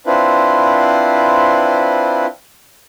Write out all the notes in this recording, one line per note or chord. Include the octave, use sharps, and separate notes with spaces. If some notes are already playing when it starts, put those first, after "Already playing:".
C4 D4 E4 F4 B4 C5